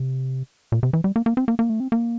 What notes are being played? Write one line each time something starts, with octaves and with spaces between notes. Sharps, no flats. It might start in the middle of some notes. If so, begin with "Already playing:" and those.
Already playing: C3
A#2
C3
E3
G3
A#3
A#3
C4
A#3
A#3
A3
C4
A#3